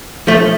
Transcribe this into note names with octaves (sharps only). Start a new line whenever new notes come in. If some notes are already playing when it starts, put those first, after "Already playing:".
F3 A3